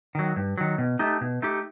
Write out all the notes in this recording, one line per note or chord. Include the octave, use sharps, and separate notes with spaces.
D#3 F#3
G2
D#3 F#3
B2
A3 D#4 G4
B2
A3 D#4 G4